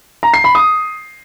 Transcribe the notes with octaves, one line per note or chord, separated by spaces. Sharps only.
A#5
C7
B5
D#6